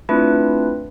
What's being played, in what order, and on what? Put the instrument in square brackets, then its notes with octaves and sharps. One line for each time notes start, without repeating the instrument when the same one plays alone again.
[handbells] A3 C4 D4 E4 F4 B4